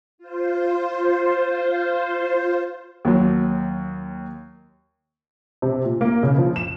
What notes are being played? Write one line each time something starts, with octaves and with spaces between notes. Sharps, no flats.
F4 C5
D#2 F#3
C3
A#2
A#3
C#3
F3
E7